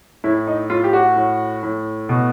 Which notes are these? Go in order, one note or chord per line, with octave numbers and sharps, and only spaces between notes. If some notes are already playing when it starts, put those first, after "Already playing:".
A2 E4
D#4
A2 F4
G4
F#4
A2
A2
B2